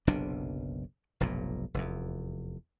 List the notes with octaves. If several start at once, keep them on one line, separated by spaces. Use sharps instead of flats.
F#1 B1 C3 D4
F1 B1 G2 A#2
F1 E2